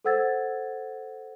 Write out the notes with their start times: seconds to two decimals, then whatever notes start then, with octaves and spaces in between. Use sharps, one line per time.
0.04 A4 C5 F#5 E6 G#6 A6